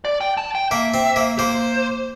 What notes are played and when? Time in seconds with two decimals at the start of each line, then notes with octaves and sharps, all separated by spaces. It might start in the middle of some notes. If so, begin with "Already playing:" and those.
0.05 D5
0.21 G5
0.37 A5
0.55 G5
0.71 A#3 E5
0.94 C4
1.16 A#3
1.39 A#3 C5